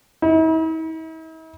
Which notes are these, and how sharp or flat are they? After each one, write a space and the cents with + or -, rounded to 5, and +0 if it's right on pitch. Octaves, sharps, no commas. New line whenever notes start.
E4 -45